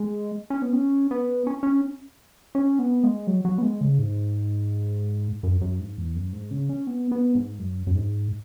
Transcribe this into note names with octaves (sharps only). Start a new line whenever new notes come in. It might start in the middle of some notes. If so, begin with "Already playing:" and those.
Already playing: G#3
C#4
B3
C#4
B3
C#4
C#4
C#4
B3
G#3
F#3
F#3
B3
G#3
C#3
G#2
F#2
F#2
G#2
E2
F#2
G#2
C#3
C#4
B3
B3
G#2
F#2
F#2
G#2